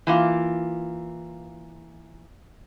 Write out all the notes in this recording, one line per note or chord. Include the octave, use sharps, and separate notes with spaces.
E3 A#3 F4